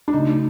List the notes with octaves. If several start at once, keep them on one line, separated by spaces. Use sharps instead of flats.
D4
C#3 F#3 A3 D#4